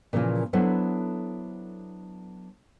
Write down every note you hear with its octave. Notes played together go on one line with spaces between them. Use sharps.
A#2 C#3 E3 F3 A#3 F4
F#3 B3 D4 E4 A4 C5